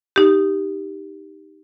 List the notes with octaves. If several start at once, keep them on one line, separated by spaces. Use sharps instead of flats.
D#4 G4